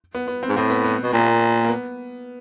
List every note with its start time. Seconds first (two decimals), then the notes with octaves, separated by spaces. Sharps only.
0.15 B3
0.28 B3
0.43 C4
0.49 G#2
0.57 A2 C4
0.70 B3
0.84 B3
1.03 B2
1.12 A#2 A#3
1.64 A#3
1.69 B3